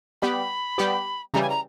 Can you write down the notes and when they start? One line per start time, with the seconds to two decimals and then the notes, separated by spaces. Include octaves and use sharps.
0.22 G3 B3 G4 B5
0.78 G3 B3 G4
1.33 C#3 E3 G3 A#5
1.41 G#5
1.49 A#5